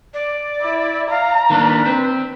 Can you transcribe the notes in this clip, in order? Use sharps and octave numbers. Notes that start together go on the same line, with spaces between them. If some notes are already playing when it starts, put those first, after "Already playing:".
D5
E4
F5 A#5
D#3 A#3 D4 B4
C4